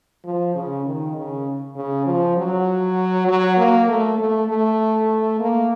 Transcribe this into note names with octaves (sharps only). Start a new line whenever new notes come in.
F3
C#3
D#3
C#3
C#3
F3
F#3
F#3
A#3
A3
A3
A3
A#3